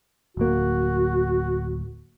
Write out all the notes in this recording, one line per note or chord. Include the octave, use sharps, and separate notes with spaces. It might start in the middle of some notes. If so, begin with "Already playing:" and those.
D1 A#3 F#4